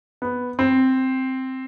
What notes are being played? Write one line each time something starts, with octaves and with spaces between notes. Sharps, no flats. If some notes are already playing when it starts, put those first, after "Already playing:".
B3
C4